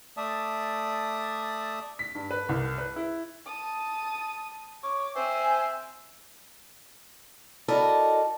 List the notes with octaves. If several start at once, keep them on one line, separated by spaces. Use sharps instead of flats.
A3 D5 E5 A5 D#6
B6
G2
B4
C2
B4
E4
A5 D#6
C#5 D6
C4 C5 E5 G#5
E4 F#4 A4 A#4 D5 D#5